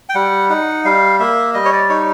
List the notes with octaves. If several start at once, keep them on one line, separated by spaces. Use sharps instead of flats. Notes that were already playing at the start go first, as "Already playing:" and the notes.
G5
G3 F#5
D#4 F#5
G3 F5
A#3 E5
G3 D#5
C#5
D5
D#4 C#5